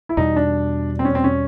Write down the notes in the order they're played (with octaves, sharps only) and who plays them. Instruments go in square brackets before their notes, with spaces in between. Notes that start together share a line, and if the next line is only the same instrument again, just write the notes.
[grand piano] E4
[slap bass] E2 B2 G3 [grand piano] D#4
[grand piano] D4
C4
C#4
C4
C#4